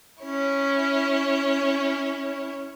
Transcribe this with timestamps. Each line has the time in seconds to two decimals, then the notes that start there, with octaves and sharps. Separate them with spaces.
0.23 C#4 E4 C#5